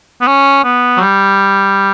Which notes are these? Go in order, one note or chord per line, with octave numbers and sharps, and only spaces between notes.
B3
C#4
B3
F#3
G3